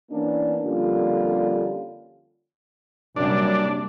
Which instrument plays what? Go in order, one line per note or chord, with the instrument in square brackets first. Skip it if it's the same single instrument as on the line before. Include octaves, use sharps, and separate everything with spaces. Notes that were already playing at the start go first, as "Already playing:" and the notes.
[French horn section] E3 A#3 B3 C#4 D4
F2 D3 G3 A#3 C#4 F4
[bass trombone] F#2 [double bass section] C3 G3 A#3 [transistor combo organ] D4